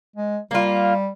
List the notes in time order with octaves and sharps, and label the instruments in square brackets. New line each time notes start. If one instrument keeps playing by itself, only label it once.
[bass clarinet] G#3
[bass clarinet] G3 [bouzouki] A#3 F4